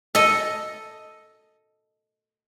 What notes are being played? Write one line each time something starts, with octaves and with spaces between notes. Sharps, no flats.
A4 D#5